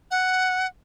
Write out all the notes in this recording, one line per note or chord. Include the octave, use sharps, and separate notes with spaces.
F#5